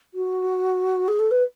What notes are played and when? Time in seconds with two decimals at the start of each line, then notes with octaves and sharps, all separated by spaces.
0.14 F#4
1.08 G#4
1.19 A4
1.31 B4